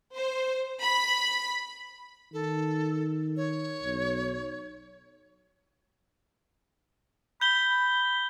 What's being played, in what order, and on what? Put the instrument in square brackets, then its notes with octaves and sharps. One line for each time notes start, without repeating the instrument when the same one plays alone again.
[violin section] C5
B5
[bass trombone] D#3 [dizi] A4
[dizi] C#5
[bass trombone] B1
[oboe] B5 [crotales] G6 G7